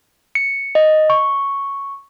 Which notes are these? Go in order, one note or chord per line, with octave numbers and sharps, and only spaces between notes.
C#7
D#5
C#6